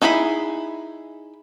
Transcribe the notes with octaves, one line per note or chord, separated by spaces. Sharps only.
D#4 E4 G#4 A#4 B5